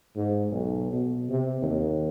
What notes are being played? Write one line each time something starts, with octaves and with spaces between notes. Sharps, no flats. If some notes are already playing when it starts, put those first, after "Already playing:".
G#2
B1
B2
C3
D#2